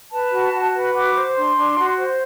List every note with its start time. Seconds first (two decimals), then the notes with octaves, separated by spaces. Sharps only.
0.11 B4 A5
0.32 F#4
0.53 F#4
0.74 B4
0.94 F#4 D6
1.15 C5
1.36 D4 C6
1.57 D4
1.78 F#4
1.98 C5